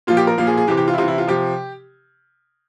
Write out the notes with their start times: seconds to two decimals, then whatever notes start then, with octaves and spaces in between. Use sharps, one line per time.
0.07 A#2 F3 F4
0.17 G4
0.27 A#4
0.38 A#2 F3 F5
0.47 G#4
0.57 G#4
0.67 C3 E3 G4
0.77 G4
0.88 F4
0.93 E4
0.98 C3 E3 F4
1.08 E4
1.18 F4
1.27 C3 F3 G4